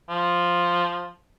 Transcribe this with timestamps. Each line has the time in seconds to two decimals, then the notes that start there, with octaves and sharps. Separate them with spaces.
0.09 F3